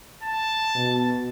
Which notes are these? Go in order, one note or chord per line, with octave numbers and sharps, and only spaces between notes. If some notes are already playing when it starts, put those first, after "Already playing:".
A5
B2